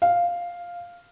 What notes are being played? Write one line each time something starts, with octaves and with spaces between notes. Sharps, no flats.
F5